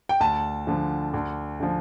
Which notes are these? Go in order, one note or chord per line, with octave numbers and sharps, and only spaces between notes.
G5
D2 A5
D3 F3
D2
D3 F3